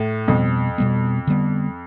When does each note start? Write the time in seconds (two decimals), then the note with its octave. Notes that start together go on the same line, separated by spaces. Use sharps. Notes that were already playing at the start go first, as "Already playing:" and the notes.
Already playing: A2
0.28 F2 B2 G3 B3
0.78 B2 G3 B3
1.27 D3 G3 B3